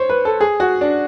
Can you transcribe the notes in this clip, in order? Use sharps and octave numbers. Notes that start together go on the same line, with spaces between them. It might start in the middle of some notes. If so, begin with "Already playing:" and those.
Already playing: C5 C#5
B4
A4
G#4
F#4
D4